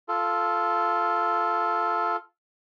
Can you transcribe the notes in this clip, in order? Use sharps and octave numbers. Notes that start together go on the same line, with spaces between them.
F4 A4